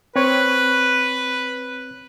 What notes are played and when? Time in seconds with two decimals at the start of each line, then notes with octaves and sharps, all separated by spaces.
0.16 C4 B4 C#5